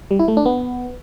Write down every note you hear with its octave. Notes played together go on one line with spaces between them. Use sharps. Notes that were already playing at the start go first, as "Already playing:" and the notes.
G3
E4
A3
D4
B3